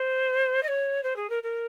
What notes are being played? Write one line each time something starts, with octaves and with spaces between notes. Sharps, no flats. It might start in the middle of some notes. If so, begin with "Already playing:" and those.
Already playing: C5
D#5
C#5
C5
G#4
A#4
A#4